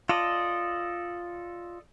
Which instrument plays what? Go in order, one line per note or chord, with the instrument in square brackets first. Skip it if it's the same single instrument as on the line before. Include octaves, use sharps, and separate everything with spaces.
[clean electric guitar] F4 [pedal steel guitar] A4 D5 D#5